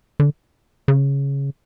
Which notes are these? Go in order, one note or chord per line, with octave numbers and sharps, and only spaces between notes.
D3
C#3